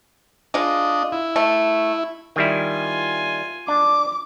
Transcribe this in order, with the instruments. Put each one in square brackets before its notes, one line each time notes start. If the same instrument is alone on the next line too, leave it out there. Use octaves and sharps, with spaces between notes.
[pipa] G#3 F4 [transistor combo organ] D4 D#5
[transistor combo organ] E4
[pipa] A3
[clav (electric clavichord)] D#3 G3 E4 [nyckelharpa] F4 G#5
[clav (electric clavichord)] D4 [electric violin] D6